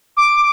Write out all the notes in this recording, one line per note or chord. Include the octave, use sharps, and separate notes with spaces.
D6